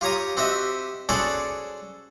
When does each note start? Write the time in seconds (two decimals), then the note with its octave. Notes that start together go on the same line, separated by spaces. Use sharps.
0.01 F4 G4 C#5 A#5 D#6
0.37 C4 F#4 G4 D#5 E5
1.09 C#4 F#4 G#4 A4 C5 D5